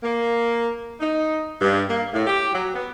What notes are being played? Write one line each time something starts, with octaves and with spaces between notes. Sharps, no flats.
A#3
D#4
G2
A#3
A2
G4
F#3
B3